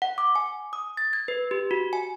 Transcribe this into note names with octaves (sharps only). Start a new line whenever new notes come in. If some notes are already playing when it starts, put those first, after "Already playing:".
F#5
D6
G#5
D#6
A6
G#6
B4
G4
F#4
G#5